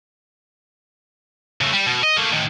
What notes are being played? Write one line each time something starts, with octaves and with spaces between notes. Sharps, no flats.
C#3 A3
G3
B2
D#5
A3 A#3
A2 D#3